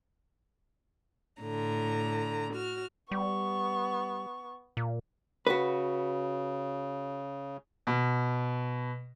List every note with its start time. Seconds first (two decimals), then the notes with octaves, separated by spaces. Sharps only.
1.41 A2 D3 A#5
2.53 F#4 F6
3.11 G3 B3 C#6
4.77 A#2
5.47 C#3 F#4 B4
7.87 B2